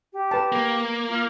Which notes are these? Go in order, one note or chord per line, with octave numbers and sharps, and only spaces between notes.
G4
B4 A5
A#3
F4